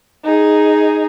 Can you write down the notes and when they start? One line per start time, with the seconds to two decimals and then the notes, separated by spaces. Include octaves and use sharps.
0.24 D#4 G#4